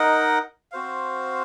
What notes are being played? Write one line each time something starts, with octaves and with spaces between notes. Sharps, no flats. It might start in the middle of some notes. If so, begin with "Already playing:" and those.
Already playing: D#4 A#4 D#5 F#5
C4 F#4 C5 F5